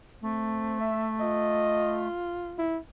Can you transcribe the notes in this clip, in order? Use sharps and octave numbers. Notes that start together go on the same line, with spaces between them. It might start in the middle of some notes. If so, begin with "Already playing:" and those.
A3 C4
E5
F4 D#5
E4